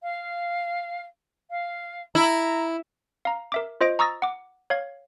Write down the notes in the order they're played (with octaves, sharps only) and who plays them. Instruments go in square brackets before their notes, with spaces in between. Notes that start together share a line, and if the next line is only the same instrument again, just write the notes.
[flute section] F5
F5
[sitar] E4 [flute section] A#5
[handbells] F5 A#5
A#4 E5 D6
F4 C5 D#5 A#6 D7
A#5 C#6 D#6 E6 A6 A#6
F#5 D6
C#5 F5 G#6